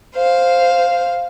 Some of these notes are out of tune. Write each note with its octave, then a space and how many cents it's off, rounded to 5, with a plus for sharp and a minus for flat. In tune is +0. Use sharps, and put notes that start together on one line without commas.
C5 +0 F5 +0